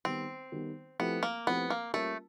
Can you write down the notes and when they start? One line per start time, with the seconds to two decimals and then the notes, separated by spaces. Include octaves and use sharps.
0.05 D#3 G3 B3 C4
0.52 D#3 G3 B3
0.99 F3 A3 B3 C4 E4 G4
1.23 A#3
1.47 F3 A3 B3 C4 E4 G4
1.70 A#3
1.94 G3 A3 A#3 C#4 F4 A#4